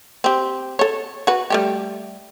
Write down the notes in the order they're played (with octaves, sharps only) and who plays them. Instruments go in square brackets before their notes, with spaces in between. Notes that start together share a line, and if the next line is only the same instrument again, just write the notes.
[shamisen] C4 G4
A4 C#5
F#4 B4
G3 A3 G4